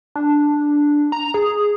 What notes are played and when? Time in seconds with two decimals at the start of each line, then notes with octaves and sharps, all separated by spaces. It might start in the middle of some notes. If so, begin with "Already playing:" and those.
0.16 D4
1.12 A#5
1.34 G#4